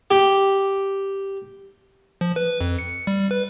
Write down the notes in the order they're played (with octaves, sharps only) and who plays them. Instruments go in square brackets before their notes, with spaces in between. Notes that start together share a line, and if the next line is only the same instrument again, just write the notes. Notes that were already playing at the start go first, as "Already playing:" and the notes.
[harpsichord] G4
[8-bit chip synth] F3
B4
F2
C#7
G3
B4